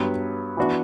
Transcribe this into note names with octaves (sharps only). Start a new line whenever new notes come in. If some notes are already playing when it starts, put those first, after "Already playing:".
Already playing: G2 F#3 B3
E3 B3 D4 F#4